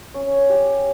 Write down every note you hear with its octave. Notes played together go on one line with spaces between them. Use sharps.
C#4
G4